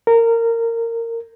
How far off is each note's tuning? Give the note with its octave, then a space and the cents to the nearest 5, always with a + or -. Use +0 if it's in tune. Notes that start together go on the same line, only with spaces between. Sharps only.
A#4 -20